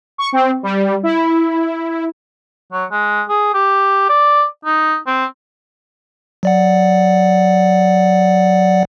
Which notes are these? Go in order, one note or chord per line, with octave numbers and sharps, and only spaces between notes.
C#6
C4
G3
E4
F#3
G#3
G#4
G4
D5
D#4
C4
F#3 D5 F#5